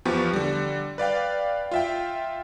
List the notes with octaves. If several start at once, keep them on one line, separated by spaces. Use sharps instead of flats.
E2 F3 B3 G4 C#6
D3 G3
B4 D5 F5 G5
F4 E5 G5